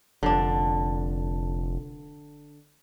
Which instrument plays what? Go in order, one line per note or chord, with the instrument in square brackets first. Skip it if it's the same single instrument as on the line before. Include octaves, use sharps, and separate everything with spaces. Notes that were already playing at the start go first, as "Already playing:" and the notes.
[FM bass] F1 [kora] D3 D4